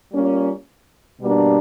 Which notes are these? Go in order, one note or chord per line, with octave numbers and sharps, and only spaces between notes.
G3 A#3 C#4 F4
B2 G3 A#3 D4